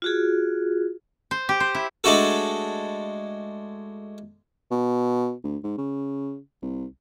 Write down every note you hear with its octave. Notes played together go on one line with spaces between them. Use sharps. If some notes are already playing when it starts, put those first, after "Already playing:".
F4 F#4 G#4
C5
G4
C5
E4
G#3 A3 D4 F#4 A4
B2
D2
G#2
C#3
C2